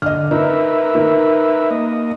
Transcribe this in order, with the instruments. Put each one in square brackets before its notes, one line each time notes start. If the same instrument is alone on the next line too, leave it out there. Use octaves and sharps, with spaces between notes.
[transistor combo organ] D3 [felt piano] D#5 F6
[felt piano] D#4 [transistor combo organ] A#4 B4 E5
[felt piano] D#3
[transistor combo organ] A#3 D#5